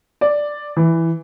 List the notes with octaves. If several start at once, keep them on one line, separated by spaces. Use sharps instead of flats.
D5
E3